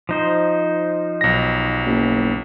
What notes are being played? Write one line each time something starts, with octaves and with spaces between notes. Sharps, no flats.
F3 D#4 C5
B1 A#6
F#1